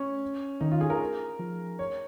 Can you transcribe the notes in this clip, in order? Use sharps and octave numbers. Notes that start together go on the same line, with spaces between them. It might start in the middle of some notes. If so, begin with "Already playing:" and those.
Already playing: C#4
D#3 D#4
F4
G#4
A#4
F3
C#5